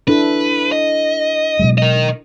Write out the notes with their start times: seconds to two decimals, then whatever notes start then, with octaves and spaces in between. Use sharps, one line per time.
0.08 D4 E4 A4 B4
0.72 D#5
1.59 B2 F#3 G#3
1.78 A#4 D#5